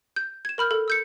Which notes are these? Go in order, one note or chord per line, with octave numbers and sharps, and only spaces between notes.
G6
G#6 E7
A#4 B5 F6 G6
A4
E6 G6 C#7